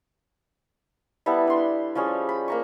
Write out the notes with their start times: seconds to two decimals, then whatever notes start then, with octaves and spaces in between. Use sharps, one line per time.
1.26 G3 B3 E4 A4
1.47 D4 C6
1.95 F3 G3 C#4 G#4
2.29 B5
2.48 A#3 A#5 C#6